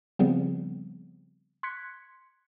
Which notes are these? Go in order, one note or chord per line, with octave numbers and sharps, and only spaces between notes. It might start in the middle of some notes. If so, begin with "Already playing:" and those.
C#3 F3 G3 B3 C4
C6 F#6 G#6 B6 C#7